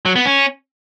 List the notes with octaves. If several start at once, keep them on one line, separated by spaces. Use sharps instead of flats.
F#3
B3
C#4